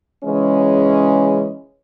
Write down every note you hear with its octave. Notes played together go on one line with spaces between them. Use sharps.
C#3 E3 G#3 C#4